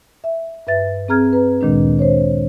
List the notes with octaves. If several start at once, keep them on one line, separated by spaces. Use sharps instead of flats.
E5
G2 B4 E5 A6
C4 G#4 A#5 F6 G#6
B4 A#5
D2 A#2 D#3 G#3 D4
C5 C#5